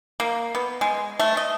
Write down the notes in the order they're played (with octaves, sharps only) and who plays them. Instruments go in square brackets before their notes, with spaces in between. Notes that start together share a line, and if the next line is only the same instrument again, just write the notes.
[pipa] A#3
B3
G#3
A3
D#5